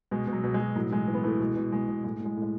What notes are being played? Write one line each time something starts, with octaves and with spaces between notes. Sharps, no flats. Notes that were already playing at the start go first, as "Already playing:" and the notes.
B2 G#3
B2
F#3
B2
G#3
B2
A2 F#3
E3 G#3
E3
B3
E3 A3
B2 G#3
B2
B2 G#3
B2
A2 G#3
A2
G#3
A2
G#3